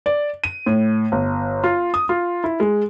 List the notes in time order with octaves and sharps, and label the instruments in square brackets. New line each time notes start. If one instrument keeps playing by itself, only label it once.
[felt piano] D5
D#7
A2
G1
F4
D#6
F4
E4
G#3